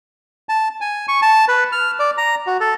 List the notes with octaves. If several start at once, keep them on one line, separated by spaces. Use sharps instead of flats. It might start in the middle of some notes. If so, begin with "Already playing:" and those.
A5
G#5
C#6
A5
B4
F6
D5
A#5
F#4
A4